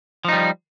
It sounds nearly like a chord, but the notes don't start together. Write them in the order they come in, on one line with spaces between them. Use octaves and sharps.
F3 D#4 G3